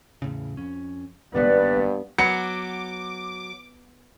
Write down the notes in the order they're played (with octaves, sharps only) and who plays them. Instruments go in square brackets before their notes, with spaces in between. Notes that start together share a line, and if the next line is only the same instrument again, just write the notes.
[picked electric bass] E2 A2 C#3
F2 C#4
[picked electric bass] G#1 D#3 A#3 [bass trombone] G2 [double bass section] B3 [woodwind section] B4 D5
[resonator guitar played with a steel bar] F#3 [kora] B3 [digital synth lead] D6 [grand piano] C#7